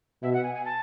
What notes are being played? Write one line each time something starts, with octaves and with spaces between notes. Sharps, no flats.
B2 E5
F#5
G#5
G#5
A5